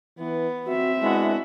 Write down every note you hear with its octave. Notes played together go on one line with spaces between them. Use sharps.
E3 B3
C4 F#4 E5
G#3 B3 D4 E4 F#4